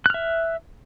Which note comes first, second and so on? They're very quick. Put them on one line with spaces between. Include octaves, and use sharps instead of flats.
F#6 F6 E5